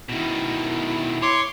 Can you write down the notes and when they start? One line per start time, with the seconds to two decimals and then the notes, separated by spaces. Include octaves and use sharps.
0.09 B2 D#3 E4
1.22 C#5 C6 D6